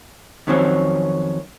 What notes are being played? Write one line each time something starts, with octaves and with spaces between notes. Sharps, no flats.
F2 D#3 F#3 C4 C#4